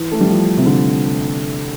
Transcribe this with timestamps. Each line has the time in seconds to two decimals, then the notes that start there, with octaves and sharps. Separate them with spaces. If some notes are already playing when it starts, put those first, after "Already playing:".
Already playing: E3
0.12 A3
0.20 G3
0.28 F3
0.57 C3
0.66 D3